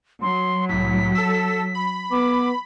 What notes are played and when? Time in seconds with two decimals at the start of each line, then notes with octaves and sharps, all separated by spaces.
0.22 F#3 C6
0.69 C2 A2 B6
1.15 A4 E6
1.75 B5
2.11 B3 D6